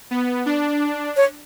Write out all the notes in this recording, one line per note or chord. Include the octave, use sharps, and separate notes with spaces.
B3
D4
C#5